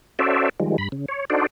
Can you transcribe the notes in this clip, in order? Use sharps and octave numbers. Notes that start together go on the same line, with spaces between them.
C#4 F#4 A4 C5 D5 E5
D#3 F3 G3 G#3
G2 B5
C#3
C#5
D4 D#4 F#4 A4 C5 D5